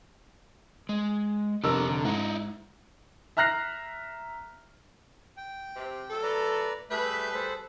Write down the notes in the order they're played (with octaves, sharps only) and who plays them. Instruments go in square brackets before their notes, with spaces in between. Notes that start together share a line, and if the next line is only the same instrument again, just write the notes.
[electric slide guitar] G#3
[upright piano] F1 A#4 E6 [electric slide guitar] D4 G4 A4
[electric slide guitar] D3
[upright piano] G#2 [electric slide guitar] D#4 E4
[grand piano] E5 A#5 F6 F#6 A#6 C7
[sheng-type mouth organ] G5
[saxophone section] C3
F#3 A3 A4
[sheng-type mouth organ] B4 D5 A#5
[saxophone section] G3 G#4 B4 [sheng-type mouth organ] A3 E5 G6
[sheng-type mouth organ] A4 C5